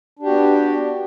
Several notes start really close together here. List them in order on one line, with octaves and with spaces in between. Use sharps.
D4 G4 F#4 B3